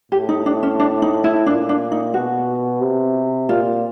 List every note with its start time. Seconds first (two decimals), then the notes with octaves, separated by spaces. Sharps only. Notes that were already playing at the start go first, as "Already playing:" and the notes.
0.12 A2 G4
0.29 D#4
0.46 D4
0.63 C#4
0.80 D4
1.02 D#4
1.24 E4
1.46 A#2 D4
1.69 D4
1.92 D#4
2.14 B2 F#4
2.81 C3
3.49 A#2 F4